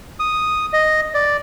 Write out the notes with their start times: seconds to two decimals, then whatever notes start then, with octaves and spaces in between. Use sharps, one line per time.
0.20 D#6
0.73 D#5
1.14 D5